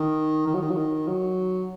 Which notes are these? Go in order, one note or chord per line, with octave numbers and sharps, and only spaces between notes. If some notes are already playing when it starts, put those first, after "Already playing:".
Already playing: D#3
D#3
F#3
D#3
F#3
D#3
F#3